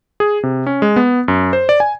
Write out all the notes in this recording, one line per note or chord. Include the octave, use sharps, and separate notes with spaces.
G#4
C3
C#4
G#3
B3
F#2
C5
D5
G#5